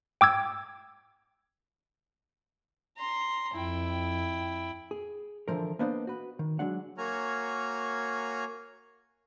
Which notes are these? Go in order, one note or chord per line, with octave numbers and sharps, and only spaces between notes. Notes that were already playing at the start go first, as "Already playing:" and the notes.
G5 D6 E6 G#6
A#5 C6
F2 E4 G5
G#4
D3 E3 F3 A#4
A#3 B3 D4 C5 D5 D#5
F#4 B4
D#3
F#3 G#3 D4 F#5
A#3 F#4 C#5 G#5 A#5 F6